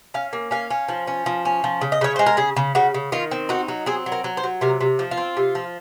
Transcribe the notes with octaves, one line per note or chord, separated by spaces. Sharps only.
C#4 F5
A#3
C#4 F5
C#4
F3
C#4
F3
C#4
F3
C#3
D#5
C#3 C#5
G#3 C5
A#4
C#3 G#4
C#3
C#3 F#4
C#3
D#3 F4
C4
D#4 F#4
F#3
C4 G#4
F#3
A#4
F#3
C5
F#3
C3 A#4
C3
F3
F4
C4
C3
F3